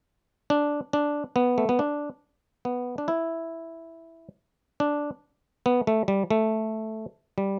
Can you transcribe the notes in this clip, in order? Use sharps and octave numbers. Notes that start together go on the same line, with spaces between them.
D4
D4
B3
A3
B3
D4
B3
D4
E4
D4
B3
A3
G3
A3
G3